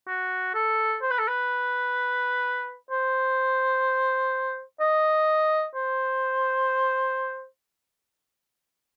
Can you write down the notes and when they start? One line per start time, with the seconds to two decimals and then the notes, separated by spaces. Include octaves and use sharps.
0.07 F#4
0.54 A4
1.02 C5
1.11 B4
1.19 A4
1.28 B4
2.91 C5
4.80 D#5
5.75 C5